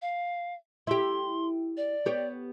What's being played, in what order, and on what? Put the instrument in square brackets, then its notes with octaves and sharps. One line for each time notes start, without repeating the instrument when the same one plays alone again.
[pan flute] F5
[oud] E4 G4 [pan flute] C6
[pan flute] D5
[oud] B3 G4 C#5